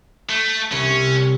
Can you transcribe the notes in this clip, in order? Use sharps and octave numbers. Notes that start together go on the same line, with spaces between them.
A3
C2 C#4